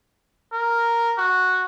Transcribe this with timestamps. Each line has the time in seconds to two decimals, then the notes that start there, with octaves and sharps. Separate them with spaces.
0.53 A#4
1.18 F#4